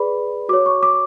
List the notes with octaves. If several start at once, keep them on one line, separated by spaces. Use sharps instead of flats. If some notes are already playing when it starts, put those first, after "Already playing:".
Already playing: G#4 B4 D5 B5
F#4 C#5 D6
C#6
D6